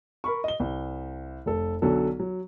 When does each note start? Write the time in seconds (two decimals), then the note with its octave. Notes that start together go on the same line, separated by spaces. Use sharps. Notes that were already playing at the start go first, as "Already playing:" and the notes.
0.24 A#4 B5 C#6
0.44 D#5 G7
0.60 C2
1.46 F1 A4
1.82 B1 D3 F#3 A4
2.19 F#3